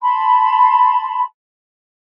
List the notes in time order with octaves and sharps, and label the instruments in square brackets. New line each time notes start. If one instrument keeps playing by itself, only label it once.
[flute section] A5 B5 C6